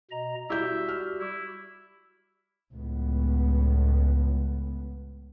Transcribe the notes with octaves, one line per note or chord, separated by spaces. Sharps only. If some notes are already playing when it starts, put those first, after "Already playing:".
B2 D#5 A#5
G3 E4 F#4 G4 E5 G6
F6
E4
C#2 A2 B3